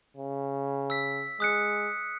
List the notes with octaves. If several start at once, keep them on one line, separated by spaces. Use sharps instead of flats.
C#3
E6 B6
G#3 D#6 F#6 C#7